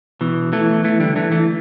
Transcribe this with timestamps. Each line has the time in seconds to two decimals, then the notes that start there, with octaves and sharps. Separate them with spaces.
0.21 B2 E3
0.53 E3 A3
0.84 E3 A3
1.00 D3 G3
1.16 E3 A3
1.32 E3 A3